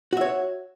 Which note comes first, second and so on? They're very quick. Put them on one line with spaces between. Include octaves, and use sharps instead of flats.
F#4 E5 C#5